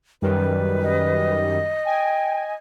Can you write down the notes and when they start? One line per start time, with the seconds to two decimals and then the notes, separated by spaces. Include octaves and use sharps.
0.22 F#2 D#3 G3 B4
0.81 D#5
1.85 G5 G#5